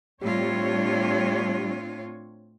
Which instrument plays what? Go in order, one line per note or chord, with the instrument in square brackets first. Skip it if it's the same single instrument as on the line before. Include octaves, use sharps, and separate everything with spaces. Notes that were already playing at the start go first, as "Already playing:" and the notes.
[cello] A2 F4 [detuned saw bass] G3 [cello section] C4 D4 C#5